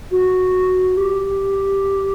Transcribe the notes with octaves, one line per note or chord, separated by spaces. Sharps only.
F#4
G4